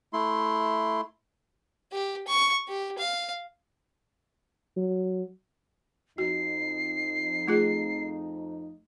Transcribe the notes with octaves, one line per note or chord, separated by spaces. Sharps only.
A3 E4 C6
G4
C#6
G4
F5
F#3
F2 D#4 F#4 C7
A3 F4 G#4